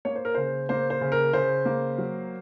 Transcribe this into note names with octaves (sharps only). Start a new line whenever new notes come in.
A#3 C#5
C5
A#4
C#3 C5
A#3 C5
C5
C#3
A#4
C#3 C5
A#3
F#3